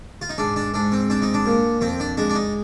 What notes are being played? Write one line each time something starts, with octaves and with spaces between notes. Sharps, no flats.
F4
D#4
G#2 D4
D4
G#2 D4
C4
C4 D4
D#4
D4
A#2
F2 C4
D4
G#3 D4
D4
D#4